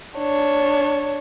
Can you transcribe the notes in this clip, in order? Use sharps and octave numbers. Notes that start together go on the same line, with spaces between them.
D4 C#5